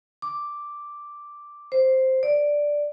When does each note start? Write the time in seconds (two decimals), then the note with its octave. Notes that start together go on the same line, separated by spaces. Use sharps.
0.22 D6
1.72 C5
2.23 D5